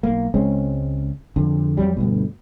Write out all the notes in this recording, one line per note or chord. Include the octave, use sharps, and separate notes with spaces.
B1 A#3
C#2 G#3 C4 C#4
F2 D3
F2 F#3 G3
D2 G2 B2